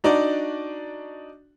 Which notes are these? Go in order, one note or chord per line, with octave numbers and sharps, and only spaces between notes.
D4 D#4 F#4 D5